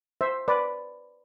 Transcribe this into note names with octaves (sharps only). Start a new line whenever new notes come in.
C5 E5
B4 D5